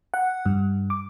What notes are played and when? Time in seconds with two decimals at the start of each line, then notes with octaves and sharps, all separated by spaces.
0.14 F#5
0.46 G2
0.90 D6